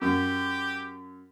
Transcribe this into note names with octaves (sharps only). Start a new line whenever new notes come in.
F#2 G4